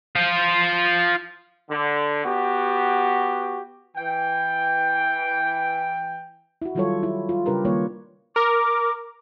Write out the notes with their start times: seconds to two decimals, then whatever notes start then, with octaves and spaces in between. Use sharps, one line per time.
0.15 F4 C5
1.69 D3
2.25 B3 F#4 G4
3.97 E3 G5
6.62 E4 F#4
6.75 D#3 F#3 G3 F4 A4 C#5
7.03 E4
7.29 F4
7.46 C#3 G3 D4 G4 A#4 B4
7.65 D#3 G3 A#3 F4 C#5
8.36 A#4 D6